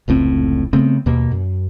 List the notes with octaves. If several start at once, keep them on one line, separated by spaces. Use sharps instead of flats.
F1 C#2 A2 C4
C#3 A3 B3 C4
D#2 B2 A#3
F#2